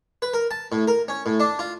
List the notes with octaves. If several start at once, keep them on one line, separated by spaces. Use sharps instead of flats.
B4
A#4
A5
A2
A#4
C#4
A2
D4
F4